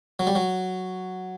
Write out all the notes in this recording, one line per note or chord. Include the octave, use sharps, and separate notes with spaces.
F#3
G3
F#3